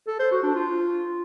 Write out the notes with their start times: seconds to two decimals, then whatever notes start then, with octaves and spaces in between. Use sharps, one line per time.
0.08 A4
0.19 C5
0.31 F#4
0.43 D4
0.55 F4